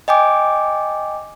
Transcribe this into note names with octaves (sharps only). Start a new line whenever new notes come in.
D#5 G5 G#5 D6